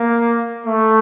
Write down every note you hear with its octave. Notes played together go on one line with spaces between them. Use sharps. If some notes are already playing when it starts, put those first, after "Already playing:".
Already playing: A#3
A3